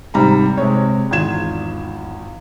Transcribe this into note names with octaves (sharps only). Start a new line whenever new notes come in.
G#2 C3 D#3 G3 A#5 B5
C3 G#3 C#5
G#1 E2 F4 G#6 E7